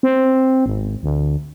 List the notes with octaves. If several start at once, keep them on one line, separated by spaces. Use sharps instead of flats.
C4
G#1
D2